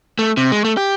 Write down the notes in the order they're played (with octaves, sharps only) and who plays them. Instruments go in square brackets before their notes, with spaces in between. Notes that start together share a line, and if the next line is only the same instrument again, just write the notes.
[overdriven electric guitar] A3
C3
G#3
A3
G4